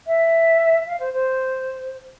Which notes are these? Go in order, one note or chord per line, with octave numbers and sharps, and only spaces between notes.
E5
F5
C5
C5